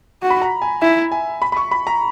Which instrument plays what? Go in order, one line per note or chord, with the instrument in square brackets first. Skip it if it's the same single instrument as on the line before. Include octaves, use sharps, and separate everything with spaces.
[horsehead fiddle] F#4
[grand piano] B5
A#5
G#5
[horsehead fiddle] E4 [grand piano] E5
[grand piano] G#5
B5
B5
C#6
B5
A#5